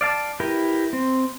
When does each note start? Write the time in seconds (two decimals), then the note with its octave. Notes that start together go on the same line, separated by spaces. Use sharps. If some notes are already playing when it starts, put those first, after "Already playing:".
0.01 D5 F5 A5
0.40 E4 G4 A#4 B4
0.93 C4